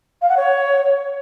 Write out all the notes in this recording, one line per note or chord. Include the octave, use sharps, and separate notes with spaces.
F5
F#5
C#5